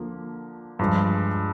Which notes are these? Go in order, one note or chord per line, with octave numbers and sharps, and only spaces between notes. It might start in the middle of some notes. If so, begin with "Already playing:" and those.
Already playing: D3 F3 A#3
G2 F3 G#3